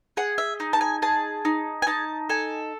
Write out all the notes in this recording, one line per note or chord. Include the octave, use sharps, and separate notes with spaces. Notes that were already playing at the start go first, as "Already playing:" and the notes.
G#4 F#5
E5
D#4
A5
G#5
G#4 A5
D#4
G#5
D#4 A5
A4 G#5